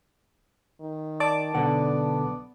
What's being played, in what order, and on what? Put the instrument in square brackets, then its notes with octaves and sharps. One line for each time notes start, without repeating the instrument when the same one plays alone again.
[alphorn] D#3
[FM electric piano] D5 A5 D6
[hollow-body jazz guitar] B1 D3 F#5 [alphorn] B3